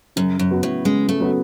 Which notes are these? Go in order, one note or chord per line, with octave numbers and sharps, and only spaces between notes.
F#2 C#3
F#2
F#3 B3 F#4
A2
C#3 G#3
A3
F#3 B3 F#4